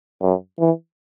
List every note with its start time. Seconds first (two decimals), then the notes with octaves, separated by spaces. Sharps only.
0.22 F#2
0.59 E3